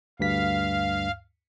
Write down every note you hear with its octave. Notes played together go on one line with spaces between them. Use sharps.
D2 G2 F5 B6